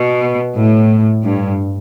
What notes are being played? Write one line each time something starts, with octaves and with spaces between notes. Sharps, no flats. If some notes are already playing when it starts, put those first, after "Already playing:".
Already playing: B2
A2
G2